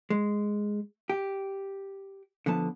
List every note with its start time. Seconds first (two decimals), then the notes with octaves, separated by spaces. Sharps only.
0.10 G#3
1.10 G4
2.46 D3 F3 B3 A5